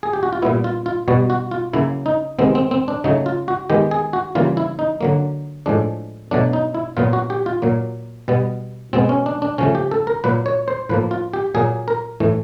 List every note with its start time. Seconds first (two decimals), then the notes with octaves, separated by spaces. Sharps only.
0.03 G#4
0.13 G4
0.23 F#4
0.33 F4
0.42 A#2 G3 B3 E4
0.64 F4
0.86 F4
1.08 B2 G3 B3 F#4
1.30 F#4
1.51 F4
1.73 C#3 F#3 A#3 E4
2.06 D#4
2.39 C3 D#3 G#3 B3 C4
2.55 C4
2.71 C4
2.88 D4
3.04 C#3 F#3 A3 D#4
3.26 F4
3.48 F#4
3.70 D#3 G#3 B3 G4
3.91 G#4
4.13 F#4
4.35 C#3 E3 G3 A#3 F4
4.57 E4
4.79 D#4
5.01 D3 F#3 A#3
5.66 A2 F3 G#3 D4
6.31 B2 F#3 A3 D4
6.53 D#4
6.75 E4
6.97 A#2 F#3 B3 F4
7.13 F#4
7.30 G4
7.46 F4
7.62 A#2 F#3 A#3
8.28 B2 G3 B3
8.93 B2 G#3 B3 C4
9.09 C#4
9.26 D4
9.42 D4
9.58 C#3 F3 A3 C#4
9.75 G4
9.91 A4
10.07 A#4
10.24 A#2 F#3 A#3 B4
10.46 C#5
10.68 C5
10.89 A2 F3 A#3 B4
11.11 F4
11.34 G4
11.54 A#2 F#3 A#3 G#4
11.88 A#4
12.20 A2 E3 A3